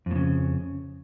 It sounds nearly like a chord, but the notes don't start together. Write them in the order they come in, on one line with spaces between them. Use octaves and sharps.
F2 A2 C#3